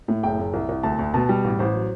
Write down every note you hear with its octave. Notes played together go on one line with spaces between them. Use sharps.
A2
F#1 G5
F#1
C2
C2
D2 A5
D2
B2 A5
G3
A1
A1 C5
F#3